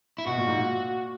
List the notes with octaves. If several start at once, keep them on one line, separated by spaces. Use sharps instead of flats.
E4
B2 F#4
A#2
G#2
A#2